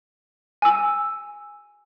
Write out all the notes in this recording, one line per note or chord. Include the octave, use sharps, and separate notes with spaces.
G#5 E6